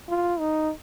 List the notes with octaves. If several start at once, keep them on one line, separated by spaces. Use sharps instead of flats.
F4
D#4